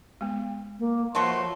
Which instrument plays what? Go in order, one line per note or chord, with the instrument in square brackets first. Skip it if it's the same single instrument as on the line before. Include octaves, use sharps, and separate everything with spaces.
[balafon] G#3 B3
[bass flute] A#3
[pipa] B2 F#3 A3 [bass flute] F3 [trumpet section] F#5 C6